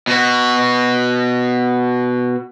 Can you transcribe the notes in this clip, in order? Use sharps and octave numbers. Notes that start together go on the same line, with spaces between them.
B2 F#4